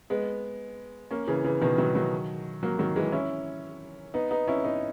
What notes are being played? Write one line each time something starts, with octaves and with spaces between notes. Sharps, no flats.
G#3 B3
A#3 C#4
C#3 E3
C#3 E3
B2 D#3
D#3 F#3
D#3 F#3
F#3 A#3
D#3 F#3
E3 G#3
C#4 E4
B3 D#4
B3 D#4
C#4 E4
B3 D#4